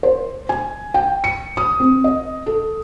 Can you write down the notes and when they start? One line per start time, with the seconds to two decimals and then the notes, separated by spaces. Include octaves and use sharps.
0.03 C5
0.49 G#5
0.94 G5
1.24 C#7
1.57 D#6
1.80 C4
2.04 D#5
2.46 A4